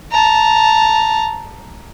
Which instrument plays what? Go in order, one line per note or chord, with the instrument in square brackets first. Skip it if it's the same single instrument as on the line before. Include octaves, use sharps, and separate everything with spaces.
[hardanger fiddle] A5 A#5